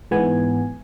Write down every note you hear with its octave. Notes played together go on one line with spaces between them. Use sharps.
G#2 E3 B3 G#5